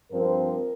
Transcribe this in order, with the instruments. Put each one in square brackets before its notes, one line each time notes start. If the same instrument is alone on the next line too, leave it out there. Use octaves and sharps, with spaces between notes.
[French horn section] G2 F3 C4 A#4